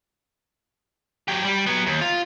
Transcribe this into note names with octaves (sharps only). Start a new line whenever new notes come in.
F#3 G4
G3
F#3 B3
D#2
F4